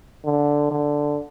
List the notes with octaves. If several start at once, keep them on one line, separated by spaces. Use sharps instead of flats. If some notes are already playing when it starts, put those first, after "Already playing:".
D3
D3